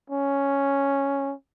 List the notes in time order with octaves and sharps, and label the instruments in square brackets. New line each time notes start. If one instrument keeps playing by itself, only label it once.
[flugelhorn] C#4